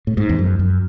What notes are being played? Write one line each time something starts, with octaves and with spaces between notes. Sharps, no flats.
A2
G#2
E2
F#2
F#2